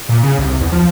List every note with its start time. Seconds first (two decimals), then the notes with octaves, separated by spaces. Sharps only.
0.09 A#2
0.23 C#3
0.39 C2
0.61 E2
0.72 F3